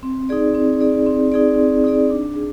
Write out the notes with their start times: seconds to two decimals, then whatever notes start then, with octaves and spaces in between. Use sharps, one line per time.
0.03 C4
0.29 D#4 G#4 D5
0.55 C4
0.81 D#4 G#4 D5
1.06 C4
1.32 D#4 G#4 D5
1.58 C4
1.84 D#4 G#4 D5
2.10 D4
2.36 G#4